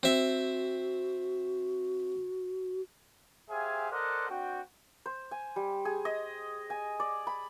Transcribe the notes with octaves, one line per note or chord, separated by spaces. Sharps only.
C4 F#4 E5
G4 G#4 C5 E5 F5 G#5
A4 A#4 C5 D5 D#5 F#5
C4 D4 F#4 G5
C5
G#5
G3
G#4
D#5
G#5
D5
B5